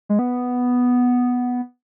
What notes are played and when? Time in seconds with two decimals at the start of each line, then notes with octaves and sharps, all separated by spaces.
0.09 G#3
0.19 B3